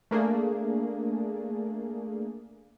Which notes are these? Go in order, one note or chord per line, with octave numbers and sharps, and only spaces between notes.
A3 A#3 D4 G#4